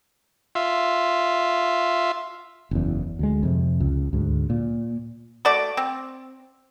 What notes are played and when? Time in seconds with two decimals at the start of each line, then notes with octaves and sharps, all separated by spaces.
0.55 F4 E5
2.71 F#1 E2
3.19 D2 G#3
3.43 F2 C3
3.80 C#2
4.13 D2 G#2
4.50 A#2
5.45 A3 F#4 D5
5.77 C4